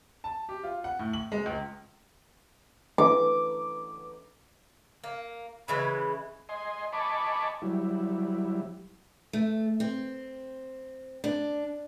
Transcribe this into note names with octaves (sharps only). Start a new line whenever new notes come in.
A5
G4
F4
F#5
A2
F#7
G#3
C#2
D6
A#3
C#3 E3 G#3 B5
D#5 G#5 C6
D#5 G#5 A5 B5 C#6 D6
F#3 G3 E4
A3
C4
D4